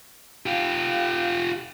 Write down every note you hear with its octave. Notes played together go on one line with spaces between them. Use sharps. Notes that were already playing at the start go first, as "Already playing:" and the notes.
F4 G4 F5